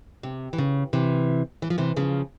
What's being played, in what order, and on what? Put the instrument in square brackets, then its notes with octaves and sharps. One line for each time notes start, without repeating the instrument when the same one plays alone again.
[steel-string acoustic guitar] C3
E3
C#3
C3 E3
E3
F3
C3 E3
C#3 F3